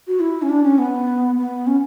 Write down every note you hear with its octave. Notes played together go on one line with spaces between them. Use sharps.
F#4
E4
C#4
D4
C#4
B3
B3
C#4